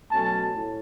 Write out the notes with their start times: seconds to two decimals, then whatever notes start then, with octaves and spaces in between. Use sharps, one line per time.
0.11 B2 F#3 A3 C#4 A5
0.51 A2